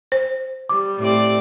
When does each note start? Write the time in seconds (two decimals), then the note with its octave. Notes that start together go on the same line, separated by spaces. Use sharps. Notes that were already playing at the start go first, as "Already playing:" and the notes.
0.12 C5
0.69 G3 D6
0.99 A2 C4 D5